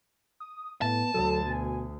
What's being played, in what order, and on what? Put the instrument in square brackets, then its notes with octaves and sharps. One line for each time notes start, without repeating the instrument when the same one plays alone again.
[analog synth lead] D#6
[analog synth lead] A2 [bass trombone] B3 [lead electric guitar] A5
[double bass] D2 [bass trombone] F#3 [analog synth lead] A4
[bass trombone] B2 [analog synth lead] G#5